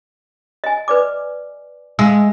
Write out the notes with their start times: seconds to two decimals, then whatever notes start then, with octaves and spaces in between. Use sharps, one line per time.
0.64 D#5 G#5
0.88 B4 D5 D6
1.99 G#3 F5 E6